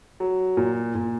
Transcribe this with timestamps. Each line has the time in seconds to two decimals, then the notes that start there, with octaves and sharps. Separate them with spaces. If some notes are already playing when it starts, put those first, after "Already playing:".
0.20 F#3
0.57 A#2
0.95 A#2